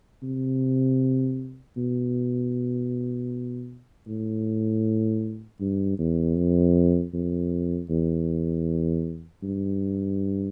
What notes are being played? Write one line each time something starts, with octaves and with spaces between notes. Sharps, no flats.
C3
B2
A2
G2
E2
F2
F2
E2
G2